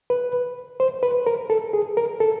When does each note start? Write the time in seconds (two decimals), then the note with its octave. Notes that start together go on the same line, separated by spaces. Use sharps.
0.10 B4
0.80 C5
1.03 B4
1.27 A#4
1.50 A4
1.73 G#4
1.97 A#4
2.20 A4